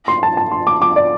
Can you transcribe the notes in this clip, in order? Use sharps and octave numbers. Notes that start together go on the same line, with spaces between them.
C6
A5
A5
C6
D6
D6
D5